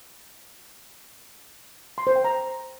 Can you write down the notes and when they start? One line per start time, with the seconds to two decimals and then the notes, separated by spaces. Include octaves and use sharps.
1.98 C6
2.07 C5
2.16 G5
2.24 A#5